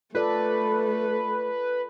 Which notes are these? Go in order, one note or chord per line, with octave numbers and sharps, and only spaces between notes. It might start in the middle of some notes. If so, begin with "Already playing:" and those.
A3 F4 A4 B4 D5